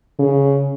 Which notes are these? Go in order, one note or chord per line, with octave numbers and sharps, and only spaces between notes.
C#3